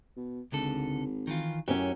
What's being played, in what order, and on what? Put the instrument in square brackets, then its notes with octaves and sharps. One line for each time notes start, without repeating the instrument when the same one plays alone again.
[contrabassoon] B2
[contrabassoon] G#1 [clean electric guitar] C#2 D3 A4
[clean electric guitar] D#3 E3 F4
[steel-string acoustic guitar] F#2 C#4 [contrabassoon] A2 [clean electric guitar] F#4 G4